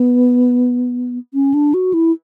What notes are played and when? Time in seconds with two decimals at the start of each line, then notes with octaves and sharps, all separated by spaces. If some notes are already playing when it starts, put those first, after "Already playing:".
Already playing: B3
1.34 C#4
1.54 D4
1.74 F#4
1.94 E4